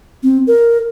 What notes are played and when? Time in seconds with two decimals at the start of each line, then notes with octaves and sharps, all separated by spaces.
0.23 C4
0.47 A#4